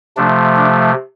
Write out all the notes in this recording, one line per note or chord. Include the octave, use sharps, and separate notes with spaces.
C3 F3 A3 D4
D4